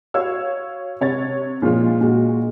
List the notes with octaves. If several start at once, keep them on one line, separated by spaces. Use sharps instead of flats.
F#4 C#5 F5 E6
C3 C#5 A6
A#2 F3 G#3 F4
A#2 G#3 F#4